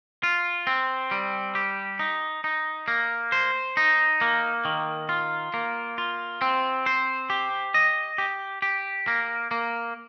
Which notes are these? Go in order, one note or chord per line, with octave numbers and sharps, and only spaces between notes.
F4
C4
G3
G4
D#4
D#4
A#3
C5
D#4
A#3
D#3
F4
A#3
F4
C4
C5
G4
D#5
G4
G4
A#3
A#3